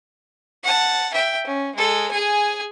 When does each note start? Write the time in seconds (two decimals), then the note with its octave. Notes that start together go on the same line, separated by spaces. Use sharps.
0.63 F#5 A5
1.13 E5 G5
1.46 C#4
1.75 G#3 A4
2.11 G#4 G#5